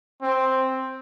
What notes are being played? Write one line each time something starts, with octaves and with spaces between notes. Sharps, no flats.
C4